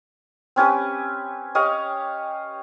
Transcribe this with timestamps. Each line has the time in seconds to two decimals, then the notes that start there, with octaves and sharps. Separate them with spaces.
0.56 C4 C#4 G4 B4
1.55 G4 C#5 D#5 F5